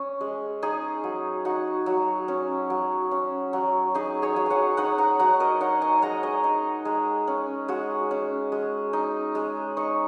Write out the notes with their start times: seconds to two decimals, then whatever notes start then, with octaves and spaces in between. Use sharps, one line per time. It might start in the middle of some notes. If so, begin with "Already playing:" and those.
Already playing: C#4
0.21 G#3
0.62 D#4 G#4
1.04 F#3
1.45 D#4 F#4
1.86 F#3
2.28 C#4
2.70 F#3
3.11 C#4
3.53 F#3
3.95 D#4 G#4
4.22 G#4 C#5
4.36 F#3
4.46 C#5 F#5 G#5
4.77 D#4 C#5 F#5
4.98 F#5 A#5
5.19 F#3 F#5 A#5
5.40 A#4 D#5
5.60 D#4 C#5 F#5
5.82 D#5 G#5
6.02 G#3 F#5 A#5
6.23 D#5 G#5
6.44 D#4
6.85 G#3
7.27 C#4
7.68 G#3 F#4
8.11 C#4
8.52 G#3
8.93 D#4
9.35 G#3
9.77 D#4 C#6